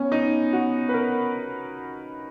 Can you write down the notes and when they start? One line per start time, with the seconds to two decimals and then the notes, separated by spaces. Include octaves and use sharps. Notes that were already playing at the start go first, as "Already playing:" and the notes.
Already playing: B3 C#4
0.12 D#4
0.53 F#4
0.89 B4
0.94 A#4